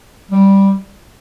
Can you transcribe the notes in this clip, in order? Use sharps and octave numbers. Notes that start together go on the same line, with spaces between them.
G3